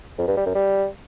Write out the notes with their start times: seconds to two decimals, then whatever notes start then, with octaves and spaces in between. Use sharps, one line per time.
0.19 F2
0.28 G2
0.37 G3
0.46 F#2
0.55 G3